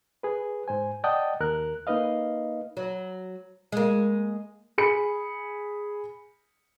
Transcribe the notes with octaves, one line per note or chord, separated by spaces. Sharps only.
G#4 B4
G#2 C5 G#5
D5 D#5 F#5 G5 A5 D#6
D#2 A#4 F#6
A#3 D#4 B4 D#5 F5
F#3
G#3 A#3
G#4 B5 C#7